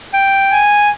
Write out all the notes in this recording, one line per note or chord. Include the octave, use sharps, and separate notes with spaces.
G5
G#5